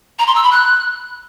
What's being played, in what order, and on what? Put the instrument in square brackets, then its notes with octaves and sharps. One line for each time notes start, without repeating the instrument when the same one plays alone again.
[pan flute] A#5
C6
E6
B5
F#6